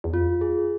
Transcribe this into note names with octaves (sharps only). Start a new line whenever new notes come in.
E2
F2 F4
G#4